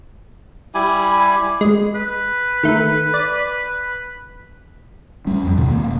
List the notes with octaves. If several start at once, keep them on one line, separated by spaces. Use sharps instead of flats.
G3 E4 G4 G#5
G#3
B4
D#3 A3
D5
G3 C#4
F2
D#2 B2 D#3
A#3 C4
E1